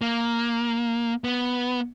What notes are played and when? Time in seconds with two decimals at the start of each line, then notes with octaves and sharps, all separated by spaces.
0.01 A#3
1.24 B3